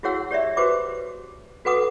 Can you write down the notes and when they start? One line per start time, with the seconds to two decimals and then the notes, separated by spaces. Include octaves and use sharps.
0.03 E4 F#4 G#4 C#5 F#5 E6
0.31 G4 C#5 D5 E5
0.57 F#4 G4 B4 C5 D6
1.65 F#4 A4 B4 F#5 D6 D#6